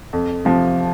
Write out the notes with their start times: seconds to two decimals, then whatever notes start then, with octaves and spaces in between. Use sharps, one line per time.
0.13 F2
0.45 C3 F3